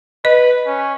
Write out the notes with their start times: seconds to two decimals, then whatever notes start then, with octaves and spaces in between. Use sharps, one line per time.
0.25 B4 D#5
0.67 C#4